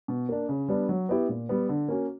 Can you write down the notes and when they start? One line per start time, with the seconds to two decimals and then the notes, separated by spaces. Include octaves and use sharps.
0.08 B2
0.29 A#3 D4
0.49 C#3
0.68 G3 B3 D4
0.89 F#3
1.09 B3 E4 G4
1.29 A#2
1.49 G3 B3
1.69 D3
1.88 A#3 C#4 F#4